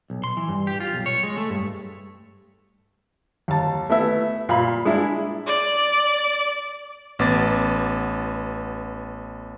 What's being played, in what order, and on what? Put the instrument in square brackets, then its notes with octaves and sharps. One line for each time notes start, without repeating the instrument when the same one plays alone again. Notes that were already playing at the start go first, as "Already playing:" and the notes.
[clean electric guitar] B1
C6
E3
G2
G4
F4
B1
C#5
G#3
A3
G2
[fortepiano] D#2 A5
A3 B3 E4 E5
A#2 F5 B5
G#3 D4 E4
[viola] D5
[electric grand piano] A1 B3 D6 A6